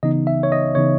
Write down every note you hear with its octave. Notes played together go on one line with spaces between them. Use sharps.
C#3 E3 B3 D#4 D#5
E5
C#5
D#5
C#3 E3 B3 D#4 C#5